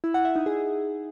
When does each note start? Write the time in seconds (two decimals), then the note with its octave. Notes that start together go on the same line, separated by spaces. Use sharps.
0.04 E4
0.14 F#5
0.25 E5
0.36 D#4
0.46 G#4